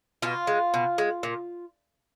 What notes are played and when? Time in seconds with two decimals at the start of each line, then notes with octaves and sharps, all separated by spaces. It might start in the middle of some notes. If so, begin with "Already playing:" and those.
0.22 B2 F4
0.47 G#3
0.74 B2
0.98 G#3
1.23 A#2